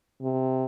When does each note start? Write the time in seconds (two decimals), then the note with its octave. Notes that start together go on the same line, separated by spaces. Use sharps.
0.21 C3